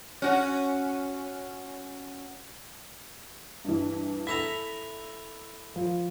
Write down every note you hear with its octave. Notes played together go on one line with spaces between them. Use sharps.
C#4 F#4
G2 E3
E4 A4 A#5 B6
F3